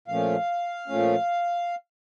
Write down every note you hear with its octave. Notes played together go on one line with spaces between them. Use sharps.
A#2 F3 A3 C#4 F5
A#2 F3 A3 C#4